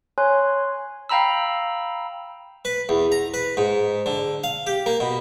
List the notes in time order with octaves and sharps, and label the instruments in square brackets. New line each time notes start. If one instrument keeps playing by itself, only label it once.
[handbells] C#5 G#5 C6 F#6
F5 G5 A#5 B5 E6
[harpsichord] B4
E2
A#5
B4
G#2
D3
F5
G4
A#3
B2